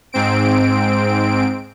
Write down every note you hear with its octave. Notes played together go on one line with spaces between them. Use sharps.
G#2 C4 D7